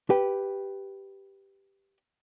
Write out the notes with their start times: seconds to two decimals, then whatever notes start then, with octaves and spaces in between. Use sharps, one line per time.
0.10 G4 B4 G5